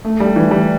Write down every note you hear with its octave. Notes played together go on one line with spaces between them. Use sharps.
A3
G3
E3
G3